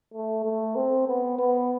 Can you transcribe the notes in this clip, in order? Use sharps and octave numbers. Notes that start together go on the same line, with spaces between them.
A3
A3
C4
B3
B3